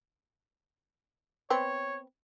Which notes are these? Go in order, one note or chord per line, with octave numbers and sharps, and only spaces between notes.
B3 C4 C#5